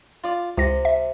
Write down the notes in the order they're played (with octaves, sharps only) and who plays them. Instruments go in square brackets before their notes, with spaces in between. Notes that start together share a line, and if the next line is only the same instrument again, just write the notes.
[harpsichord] F4 D5
[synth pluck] C#2 A#6 [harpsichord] C3
[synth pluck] E5